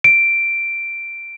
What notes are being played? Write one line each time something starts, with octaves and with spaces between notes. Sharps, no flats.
D7